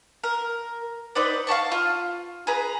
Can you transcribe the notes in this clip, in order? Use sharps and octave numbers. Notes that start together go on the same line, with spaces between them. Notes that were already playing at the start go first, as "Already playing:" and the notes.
A#4
D#4 B4 C5 D5
F5 F#5 A5 C#6
F4
G#4 B4 A#5